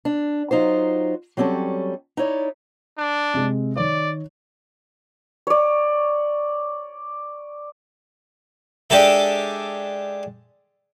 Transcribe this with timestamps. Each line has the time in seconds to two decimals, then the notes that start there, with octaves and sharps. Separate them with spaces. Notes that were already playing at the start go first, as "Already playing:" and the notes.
0.05 D4
0.51 F#3 D#4 F4 C5
1.37 F#3 G3 C4 C#4 A4
2.17 D#4 E4 C#5 D5
2.98 D4
3.34 C3 G#3
3.76 D#3 C#5 D5
5.47 C#5 D5
8.90 G#3 D4 G4 A4 E5